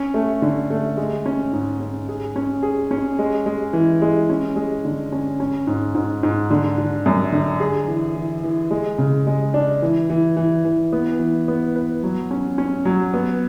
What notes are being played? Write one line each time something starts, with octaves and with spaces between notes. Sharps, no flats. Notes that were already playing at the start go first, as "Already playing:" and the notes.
Already playing: C#4
A3
D3
A3
G#3
C#4
G#2
C#4
G#4
C#4
G#4
C#4
G#3
G#3
E3
G#3
C#4
G#3
D3
C#4
C#4
G#2
G#2
G#2
D3
D3
F#2
D3
G#4
E3
E3
E3
G#3
C#3
G#3
D4
E3
E3
E3
E3
B3
E3
B3
B4
F#3
C#4
C#4
F#3
B3